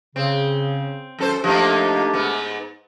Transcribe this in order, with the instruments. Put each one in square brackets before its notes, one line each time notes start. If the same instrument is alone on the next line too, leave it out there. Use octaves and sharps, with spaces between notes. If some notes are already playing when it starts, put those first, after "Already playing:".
[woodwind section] C#3 [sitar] C4
[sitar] F#2 A4 C5
[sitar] F3 A#3 D#4 [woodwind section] A3 D4 G4
[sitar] G#2 B3